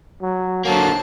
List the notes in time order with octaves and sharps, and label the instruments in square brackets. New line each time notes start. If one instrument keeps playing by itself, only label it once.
[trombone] F#3
[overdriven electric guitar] D3 A#3 [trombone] F#3 [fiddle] C5 A5